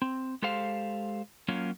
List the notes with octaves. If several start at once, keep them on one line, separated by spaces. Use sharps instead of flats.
C4
G#3 G4 A4 C5 F5
F#3 A#3 C#4 F4